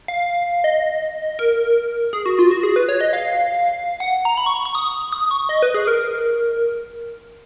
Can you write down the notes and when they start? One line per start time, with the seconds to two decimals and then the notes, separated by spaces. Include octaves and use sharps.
0.08 F5
0.64 D#5
1.39 A#4
2.13 G#4
2.26 F#4
2.39 F4
2.51 F#4
2.63 G#4
2.76 B4
2.89 C#5
3.01 D#5
3.13 F5
4.00 F#5
4.25 A#5
4.37 B5
4.46 C#6
4.65 C#6
4.75 D#6
5.12 D#6
5.31 C#6
5.49 D#5
5.62 B4
5.74 G#4
5.87 A#4